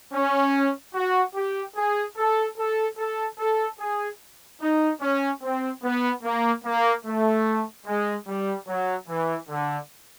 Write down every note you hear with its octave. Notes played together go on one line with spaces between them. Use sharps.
C#4
F#4
G4
G#4
A4
A4
A4
A4
G#4
D#4
C#4
C4
B3
A#3
A#3
A3
G#3
G3
F#3
E3
D3